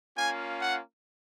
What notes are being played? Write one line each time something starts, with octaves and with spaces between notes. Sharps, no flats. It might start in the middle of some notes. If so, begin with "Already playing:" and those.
A#3 C#4 F4 G#5
F#5